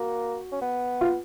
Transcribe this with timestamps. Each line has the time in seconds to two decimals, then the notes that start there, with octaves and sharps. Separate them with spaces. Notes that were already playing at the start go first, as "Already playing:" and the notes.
Already playing: A#3 F#4
0.52 C#4
0.61 B3
1.01 F4